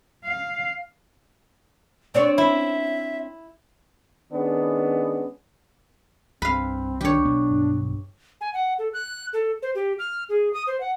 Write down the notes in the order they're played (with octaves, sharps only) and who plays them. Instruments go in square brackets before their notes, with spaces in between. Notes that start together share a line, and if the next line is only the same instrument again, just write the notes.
[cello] F5
[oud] C4 D4 C#5 [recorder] D5
[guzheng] E4 [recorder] E5
[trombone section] D#3 G#3 B3 C#4 D4
[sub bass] C2 [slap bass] G2 [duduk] C4 [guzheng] B4 F5
[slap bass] D#3 E3 [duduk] D4 [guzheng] G4 C#5
[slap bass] B1 B3
[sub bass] G2
[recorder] G#5
F#5
A4
F#6
A4
C5
G4
F6
G#4
D#6
C5
F#5